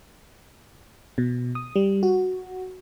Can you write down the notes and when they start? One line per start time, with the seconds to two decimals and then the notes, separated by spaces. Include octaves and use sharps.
1.18 B2
1.55 D#6
1.76 G3
2.03 F#4